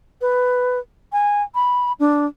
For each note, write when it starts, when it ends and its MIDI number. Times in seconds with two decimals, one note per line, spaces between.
0.21 0.79 71
1.12 1.43 80
1.55 1.92 83
2.00 2.26 62